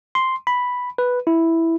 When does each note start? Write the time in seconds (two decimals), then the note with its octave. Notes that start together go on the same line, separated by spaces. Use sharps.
0.15 C6
0.47 B5
0.98 B4
1.27 E4